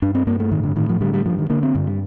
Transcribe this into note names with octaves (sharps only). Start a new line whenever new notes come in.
G2 D4
C4
G2 A#3
A3
A2 D#3
D3
A2 D#3
F3
D3 G3
G3
G2 F3
D#3
D3 A#3
C4
G2 D3
G3